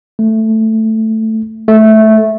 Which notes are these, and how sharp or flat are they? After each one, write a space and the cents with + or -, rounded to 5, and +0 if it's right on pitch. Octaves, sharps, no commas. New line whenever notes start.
A3 +5
A3 -10